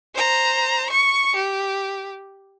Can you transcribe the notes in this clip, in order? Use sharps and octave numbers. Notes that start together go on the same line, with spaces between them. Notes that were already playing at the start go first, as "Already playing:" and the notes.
C5 A#5
C#6 C#7
G4